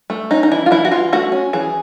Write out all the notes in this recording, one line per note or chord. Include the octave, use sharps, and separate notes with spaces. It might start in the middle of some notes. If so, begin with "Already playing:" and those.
A3
C#4 D#4
D#4
E3 E4
F4
E3 E4
F#4
E3 F4
A3 F#4
C#4
E3 G#4